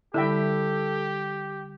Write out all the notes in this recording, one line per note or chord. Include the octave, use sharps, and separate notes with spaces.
D3 G3 E4 G4 A4 E5 G5